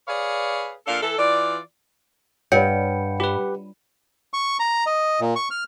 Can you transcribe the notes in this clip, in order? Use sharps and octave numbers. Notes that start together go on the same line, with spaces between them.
G#4 B4 C#5 D5 F5
A#2 D4 A4 F5
E3 A4
E3 F4 D5
G2 C#5 F#5 G5 C#7
F4 G4 B4
C#6
A#5
D#5
A#2
C#6
F6